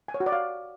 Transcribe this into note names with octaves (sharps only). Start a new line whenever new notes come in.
G#5
C#5
F#4
D5
F5